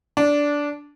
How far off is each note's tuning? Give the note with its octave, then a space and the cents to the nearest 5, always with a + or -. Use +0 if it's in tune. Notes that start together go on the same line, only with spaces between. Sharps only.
D4 -10